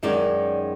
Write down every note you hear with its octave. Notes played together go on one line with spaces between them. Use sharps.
F#2 D#3 G#3 C#4 D5